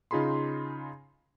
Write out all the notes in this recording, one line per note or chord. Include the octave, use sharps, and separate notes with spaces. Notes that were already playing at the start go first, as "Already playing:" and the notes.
C#3 D#4 F4 G#4 B5 C6